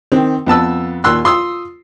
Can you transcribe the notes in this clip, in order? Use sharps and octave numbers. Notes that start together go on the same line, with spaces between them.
D#3 C4
F2 B3 A5 E6
D#2 A#2 C6 E6 F#6
F4 C6 D#6 E6